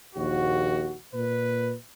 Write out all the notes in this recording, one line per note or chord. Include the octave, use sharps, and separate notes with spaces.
A#1 D#2 F#4
A#2 B4